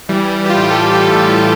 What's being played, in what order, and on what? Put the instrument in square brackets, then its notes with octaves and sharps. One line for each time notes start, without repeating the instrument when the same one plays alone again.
[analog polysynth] E3 G3
E3
G3
E3
G4
F4
A2
E3 A4
A2
A4
A2
G4
E3
F4
E3 G4